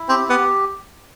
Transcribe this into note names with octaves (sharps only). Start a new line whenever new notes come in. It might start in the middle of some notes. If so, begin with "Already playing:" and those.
Already playing: E4
C4 G4
B3 G4